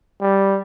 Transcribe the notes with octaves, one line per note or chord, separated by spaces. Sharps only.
G3